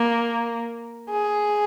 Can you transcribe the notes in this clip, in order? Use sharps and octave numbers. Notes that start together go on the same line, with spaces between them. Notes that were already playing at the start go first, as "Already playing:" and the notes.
Already playing: A#3
G#4